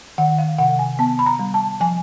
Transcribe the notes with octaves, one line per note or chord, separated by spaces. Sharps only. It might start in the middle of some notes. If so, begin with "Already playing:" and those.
D#3 F#5
F5
C3 F#5
G#5
B3 A5
B5
A#5
G3
A5
F3 G#5